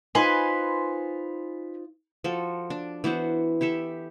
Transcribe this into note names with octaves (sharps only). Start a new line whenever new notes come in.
D#4 F4 B4 C5 G#5 C6
F3 F#4 A4
D4
E3 B3 F#4 C5
E4 G4 A4 E5